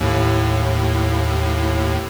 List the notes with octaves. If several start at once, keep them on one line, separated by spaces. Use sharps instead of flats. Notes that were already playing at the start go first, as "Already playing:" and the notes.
D#2 A2